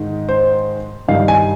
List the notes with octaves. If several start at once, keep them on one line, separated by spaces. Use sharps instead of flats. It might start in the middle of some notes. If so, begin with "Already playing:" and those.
Already playing: G#2 D#3 G#3
C5
G2 D#3 G3 F5
G#5